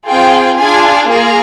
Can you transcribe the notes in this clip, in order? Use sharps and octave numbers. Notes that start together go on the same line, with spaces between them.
C4 F4 G#4 G5
D4 F4 G#4 G#5
A#3 F4 G#4 A#5